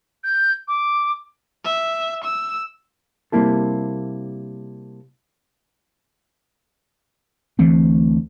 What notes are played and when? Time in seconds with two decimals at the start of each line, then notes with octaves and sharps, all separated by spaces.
0.24 G6
0.68 D6
1.64 E5
2.24 E6
3.32 C3 G3 A#3 E4 A4
7.59 D2 E3 A3 C4